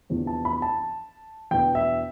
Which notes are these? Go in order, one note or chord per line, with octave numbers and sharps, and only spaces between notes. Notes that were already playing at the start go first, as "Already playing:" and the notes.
E2 C3 F3 B3 D4
A5
B5
A5
E2 B2 B3 D4 G5
E5